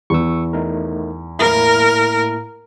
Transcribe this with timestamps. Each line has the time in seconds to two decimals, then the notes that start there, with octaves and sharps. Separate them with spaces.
0.10 E2 C#6 E6
0.53 A3 D#4 A#4
1.39 A2 A#3 E4 A#4